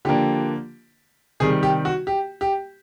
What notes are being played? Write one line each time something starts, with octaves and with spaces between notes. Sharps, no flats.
D3 F3 A#3 D4 G4
C3 D#3 G3 G#4
G4
F#4
G4
G4